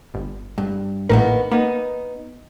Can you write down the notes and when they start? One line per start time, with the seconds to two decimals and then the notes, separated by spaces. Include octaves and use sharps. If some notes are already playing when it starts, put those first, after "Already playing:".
0.14 G1
0.58 G2
1.09 A#1 A2 D#3 A#3 B3 A#4
1.51 A#3 B3 D#4